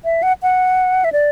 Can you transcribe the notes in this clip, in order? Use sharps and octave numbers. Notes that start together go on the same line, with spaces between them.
E5
F#5
F#5
E5
D5